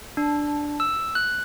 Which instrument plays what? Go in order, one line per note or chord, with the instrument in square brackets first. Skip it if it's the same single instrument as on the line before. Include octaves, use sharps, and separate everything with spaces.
[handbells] D4
E6
F#6